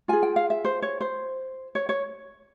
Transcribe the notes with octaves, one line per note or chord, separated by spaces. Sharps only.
F4 G#4 G#5
G5
F5
E5
C5
C#5
C5
C#5
C#5